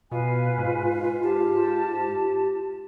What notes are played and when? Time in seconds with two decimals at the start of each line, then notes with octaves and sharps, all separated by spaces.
0.12 B2 F4 B4 F5 G#5
0.58 G#2
1.23 G4 A5